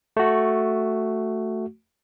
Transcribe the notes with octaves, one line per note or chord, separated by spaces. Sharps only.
A3 F#4